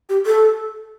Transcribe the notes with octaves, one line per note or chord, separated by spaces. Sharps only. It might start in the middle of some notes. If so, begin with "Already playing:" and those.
G4
A4